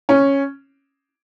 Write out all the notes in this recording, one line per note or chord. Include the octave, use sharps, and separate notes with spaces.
C#4